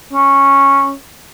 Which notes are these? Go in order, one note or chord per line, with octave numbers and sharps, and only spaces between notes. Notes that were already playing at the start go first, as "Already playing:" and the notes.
C#4